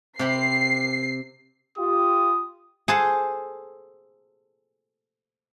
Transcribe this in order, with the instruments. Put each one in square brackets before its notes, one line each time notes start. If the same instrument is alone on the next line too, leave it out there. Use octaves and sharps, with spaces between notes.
[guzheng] C3 G4 B5 [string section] C7
[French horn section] F4 G4 [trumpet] D#6
[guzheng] G#4 A4 C5 F#5 A5